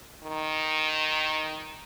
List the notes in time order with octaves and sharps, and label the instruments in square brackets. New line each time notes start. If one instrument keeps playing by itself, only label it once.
[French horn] D#3